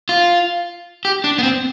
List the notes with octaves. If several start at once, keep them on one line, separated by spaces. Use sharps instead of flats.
F4
G4
D4
B3
C4